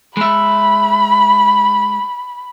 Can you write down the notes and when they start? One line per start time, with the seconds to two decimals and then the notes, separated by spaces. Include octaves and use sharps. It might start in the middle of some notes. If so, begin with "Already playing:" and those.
0.17 G#3 E5 B5